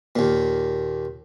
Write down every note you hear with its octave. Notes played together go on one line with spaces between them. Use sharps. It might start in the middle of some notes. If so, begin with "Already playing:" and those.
D#2 A#2